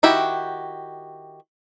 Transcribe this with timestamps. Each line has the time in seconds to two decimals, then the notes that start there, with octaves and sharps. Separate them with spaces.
0.03 D#3 E4 F#4 G4